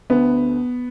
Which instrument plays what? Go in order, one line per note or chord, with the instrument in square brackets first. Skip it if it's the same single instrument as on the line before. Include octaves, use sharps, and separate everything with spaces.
[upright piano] D2 D3 B3